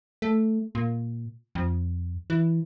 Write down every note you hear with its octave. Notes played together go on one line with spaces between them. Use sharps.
A3
A#2
F2
E3